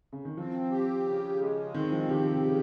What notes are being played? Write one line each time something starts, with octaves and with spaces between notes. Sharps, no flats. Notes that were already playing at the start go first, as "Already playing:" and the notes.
C#3
D#3
F3 C4
G4
C#3
G#3
D#3 C4
F3
D#3 G4
C3
C#3